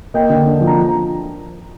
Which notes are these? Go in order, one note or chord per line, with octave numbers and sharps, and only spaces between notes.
A#3 D#5 G5
D3
D4
F3
A#5